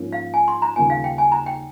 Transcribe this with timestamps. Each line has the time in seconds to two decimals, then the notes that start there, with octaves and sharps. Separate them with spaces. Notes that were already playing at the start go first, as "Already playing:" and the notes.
Already playing: G#2 F3 A#3 C#4
0.12 F5
0.34 G#5
0.48 C6
0.62 A#5
0.76 D#2 C#3 G3 A#3 F4 G#5
0.90 F5
1.04 G5
1.18 G#5
1.32 A#5
1.46 G5